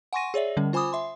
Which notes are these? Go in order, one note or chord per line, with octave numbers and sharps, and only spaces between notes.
F#5 G#5 C6 C#6 A#6 D#7
G#4 C#5 D5 E5
D3 G3 C#4
F4 C5 G#5 B5 D6 D#6
E5 C6